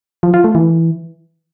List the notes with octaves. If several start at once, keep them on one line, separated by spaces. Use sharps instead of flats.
F3
F4
A3
E3